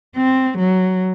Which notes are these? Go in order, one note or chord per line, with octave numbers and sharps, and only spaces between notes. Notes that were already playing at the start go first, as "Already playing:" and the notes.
C4
F#3